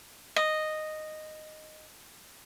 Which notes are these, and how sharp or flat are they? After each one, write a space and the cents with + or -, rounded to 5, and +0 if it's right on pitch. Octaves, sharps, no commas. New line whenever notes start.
D#5 -5